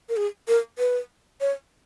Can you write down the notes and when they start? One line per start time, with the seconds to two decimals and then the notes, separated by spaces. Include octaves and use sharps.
0.09 A#4
0.17 G#4
0.48 A#4
0.78 B4
1.41 C#5